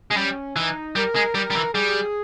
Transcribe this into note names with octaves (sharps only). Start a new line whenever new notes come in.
G#3
G3 C#4
E3 D#4
G3 A#4
G#3
G3 A#4
G3
E3
G3 G#4